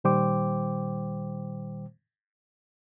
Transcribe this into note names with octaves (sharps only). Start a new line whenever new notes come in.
A#2 D#3 G3 C5 G5 D6